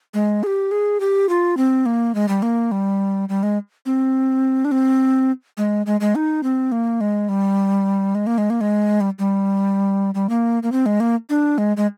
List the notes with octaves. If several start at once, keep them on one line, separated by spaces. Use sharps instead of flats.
G#3
G#4
G4
G#4
G4
F4
C4
A#3
G#3
G3
A#3
G3
G3
G#3
C4
D4
C4
G#3
G#3
G#3
D#4
C4
A#3
G#3
G3
G#3
A#3
G#3
A#3
G#3
G3
G3
G3
A#3
A#3
C4
G#3
A#3
D4
G#3
G#3